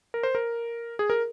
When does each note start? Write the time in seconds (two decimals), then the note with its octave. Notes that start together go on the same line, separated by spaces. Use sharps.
0.14 A#4
0.23 C5
0.35 A#4
0.99 G#4
1.10 A#4